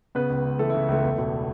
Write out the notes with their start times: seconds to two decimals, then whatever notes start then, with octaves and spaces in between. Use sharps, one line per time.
0.15 C#3 B3 B4
0.30 C#2
0.45 C#2
0.59 E3 A3 A4
0.70 E4
0.74 C#3
0.88 C#2 A3 A4
1.03 E2
1.18 E1